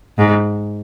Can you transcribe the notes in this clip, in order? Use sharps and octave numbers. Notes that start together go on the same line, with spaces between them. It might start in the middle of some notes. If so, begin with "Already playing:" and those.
G#2